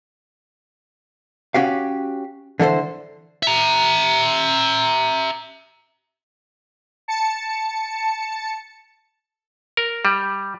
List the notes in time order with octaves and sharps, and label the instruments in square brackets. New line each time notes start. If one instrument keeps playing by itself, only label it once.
[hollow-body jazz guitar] C#4 F#4 G4 F5
D3 E3 A4 C5
[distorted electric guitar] E5 A#5
[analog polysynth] A5 C#7
[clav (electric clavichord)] A#4
G3